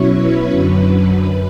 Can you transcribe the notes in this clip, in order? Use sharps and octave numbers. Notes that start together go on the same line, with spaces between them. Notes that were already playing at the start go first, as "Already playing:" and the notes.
Already playing: B2 F#3 C#4 E4 C#5
B4
F#2 D3 F#3 B4
B4
F#2 B4